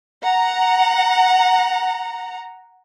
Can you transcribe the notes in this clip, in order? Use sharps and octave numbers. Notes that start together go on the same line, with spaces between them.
F#5 A#5